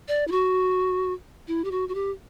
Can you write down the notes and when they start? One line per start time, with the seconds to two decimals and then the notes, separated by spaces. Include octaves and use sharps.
0.08 D5
0.28 E4
0.32 F#4
1.48 E4
1.64 G4
1.71 F#4
1.89 F#4
1.95 G4